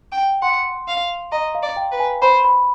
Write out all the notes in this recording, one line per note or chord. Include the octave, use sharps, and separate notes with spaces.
G5
F#5 C6
F5
D#5 A#5
F5
D5
G5
B4
G#5
C5 B5
B5